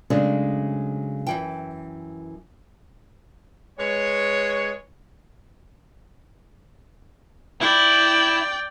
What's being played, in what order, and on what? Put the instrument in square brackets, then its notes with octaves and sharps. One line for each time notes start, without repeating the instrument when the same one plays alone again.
[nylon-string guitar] C#3 F#3 G#3 A3 C4 D4
F#2 E3 G5
[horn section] G#3 B4 C#5
[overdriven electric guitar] E4 [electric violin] D5 G5